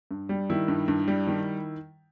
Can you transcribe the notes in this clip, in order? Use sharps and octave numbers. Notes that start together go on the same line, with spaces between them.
G2
G3
D#3 E4
G2
G2
G3
D#3